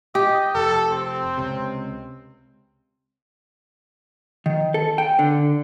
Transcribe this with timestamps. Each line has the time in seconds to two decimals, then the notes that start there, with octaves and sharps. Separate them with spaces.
0.15 G4 D#5
0.55 F1 A4
0.91 C4
1.37 C#2 C3
4.46 D#3
4.74 A4
4.98 G5
5.19 D3